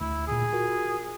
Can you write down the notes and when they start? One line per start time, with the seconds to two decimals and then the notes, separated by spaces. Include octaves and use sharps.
0.01 D2 E4
0.27 A#2 D3 G#4
0.53 F4 F#4 A#4